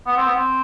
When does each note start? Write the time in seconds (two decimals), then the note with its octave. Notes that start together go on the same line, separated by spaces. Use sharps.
0.06 B3
0.16 C4
0.25 B3
0.34 C4